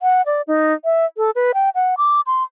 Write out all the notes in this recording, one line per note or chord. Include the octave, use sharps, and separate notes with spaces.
F#5
D5
D#4
E5
A4
B4
G5
F#5
D6
C6